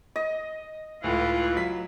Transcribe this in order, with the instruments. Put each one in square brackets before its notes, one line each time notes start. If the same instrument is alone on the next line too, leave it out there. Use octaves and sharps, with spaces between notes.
[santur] D#5
[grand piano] C#2 A2 [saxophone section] E3 [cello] F4
[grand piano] F#3 B6